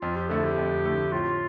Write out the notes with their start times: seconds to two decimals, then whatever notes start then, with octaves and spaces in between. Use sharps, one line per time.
0.02 F2 F4
0.16 G4
0.29 D3 A3 E4 A4
0.44 G4
0.58 F2
0.85 D3 A3 E4
1.12 A2 F4